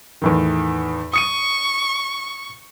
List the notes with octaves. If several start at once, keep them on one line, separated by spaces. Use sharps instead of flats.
E2 A2 D#3
C#6 D#6 C#7 D#7